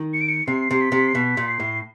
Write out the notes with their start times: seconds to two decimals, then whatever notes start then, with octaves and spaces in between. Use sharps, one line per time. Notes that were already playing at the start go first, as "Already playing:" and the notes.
Already playing: D#3
0.14 C#7
0.21 D7
0.29 C#7
0.47 C3 C7
0.71 C3 C7
0.81 B6
0.92 C3
1.08 C7
1.15 B2 B6
1.37 A#2
1.48 C7
1.60 A2